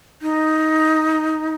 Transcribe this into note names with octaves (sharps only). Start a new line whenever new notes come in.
D#4